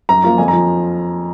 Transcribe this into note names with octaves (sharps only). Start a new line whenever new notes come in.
F#2 A#5
F3 A#3 F4
F2 G#5
A#5
F3